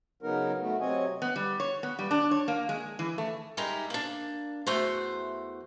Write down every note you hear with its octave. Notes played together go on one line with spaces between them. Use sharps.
C#3 F#3 B3 D#4 A#4
A3 B3 F#4
C3 F#3 C4 C#5 D#5 G#5
B3
G3
C#5
B3
G3
D4
C#5
A#3
G#3
E3
A3
G3 G#3 D#4 E4 A#4
A#3 D4
E2 A3 F#4 C5